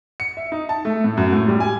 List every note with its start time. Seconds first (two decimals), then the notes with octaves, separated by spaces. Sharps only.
0.20 C#7
0.37 E5
0.52 D#4
0.69 A5
0.85 A3
1.04 A2
1.17 F#2
1.33 A2
1.48 G3
1.60 G#5